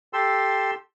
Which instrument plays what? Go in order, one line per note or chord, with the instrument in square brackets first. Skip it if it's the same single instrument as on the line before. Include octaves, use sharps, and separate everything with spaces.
[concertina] G4 A4 C6 E6